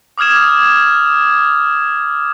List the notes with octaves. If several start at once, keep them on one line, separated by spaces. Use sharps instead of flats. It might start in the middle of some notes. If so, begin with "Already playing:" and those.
D6 D#6 F6 G#6 E7